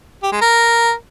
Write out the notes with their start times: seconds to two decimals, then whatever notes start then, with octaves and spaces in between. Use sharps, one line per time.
0.23 G4
0.32 G#3
0.41 A#4